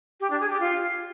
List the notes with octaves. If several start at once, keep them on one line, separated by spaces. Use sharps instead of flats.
G4
D4
G#4
G4
F4